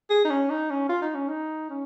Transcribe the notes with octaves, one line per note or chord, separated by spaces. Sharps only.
G#4
D#4
C#4
D#4
C#4
F4
D#4
C#4
D#4
C#4